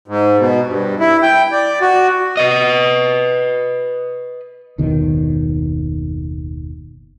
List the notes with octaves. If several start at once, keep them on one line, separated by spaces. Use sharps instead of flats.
G#2
B2
G2
E4
G5
D5
F#4
B4 D#5
F#1 D#2 B2 D#3